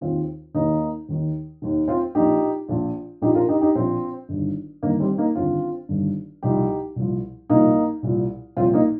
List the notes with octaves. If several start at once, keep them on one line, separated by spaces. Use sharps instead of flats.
D#2 D#3 C4 F4
D#2 D#3 A#3 D#4
D#2 D#3
D#2 D#3
C4 F4
A#1 A#2 F3 D#4 G4
A#1 A#2 F3
A#1 A#2 F3 D#4 G4
F4 A#4
D#4 G4
D#4 G4
A#1 A#2 F3 C4 F4
G1 G2 D#3
G1 G2 D#3 A#3 D#4
G3 C4
A#3 D#4
G1 G2 D#3 C4 F4
G1 G2 D#3
C2 A#2 F3 D#4 G4
C2 A#2 F3
C2 A#2 F3 A#3 D#4
C2 A#2 F3
C2 A#2 F3 C4 F4
A#3 D#4